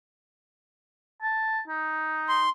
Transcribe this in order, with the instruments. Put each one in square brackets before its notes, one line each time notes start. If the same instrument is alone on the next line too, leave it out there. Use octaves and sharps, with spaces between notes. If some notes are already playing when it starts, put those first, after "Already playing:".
[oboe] A5
D#4
[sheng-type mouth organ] C6